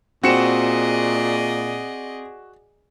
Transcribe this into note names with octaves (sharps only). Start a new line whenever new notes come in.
A#2 C4 F#4 G#4 D5 D#5 C#7 E7